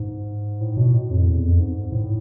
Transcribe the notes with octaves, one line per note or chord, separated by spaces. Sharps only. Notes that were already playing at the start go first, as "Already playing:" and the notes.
Already playing: G#2
A2
B2
A2
F2
E2
F2
G#2
A2